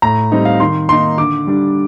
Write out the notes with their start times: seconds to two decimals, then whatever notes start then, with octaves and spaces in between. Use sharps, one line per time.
0.02 A2 A#5
0.32 G3 C4 D#4
0.45 F5
0.60 D#3 C6
0.89 A#3 D#4 C6
1.18 D3 D6
1.47 G3 D4